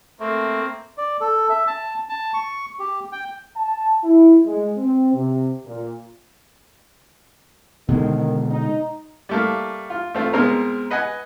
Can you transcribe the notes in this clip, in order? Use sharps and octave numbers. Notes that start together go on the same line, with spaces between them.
A3 A#3 C4
D5
A4
E5
A5
A5
C#6
G4
G5
A5
E4
G#3
C4
C3
A#2
B2 D3 D#3 G#3
D#4
G3 A3 A#3
F4
A3 C4 F4
B2 G#3 C4 A#4
B4 D#5 F#5 G#5